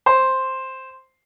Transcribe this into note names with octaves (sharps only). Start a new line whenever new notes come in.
C5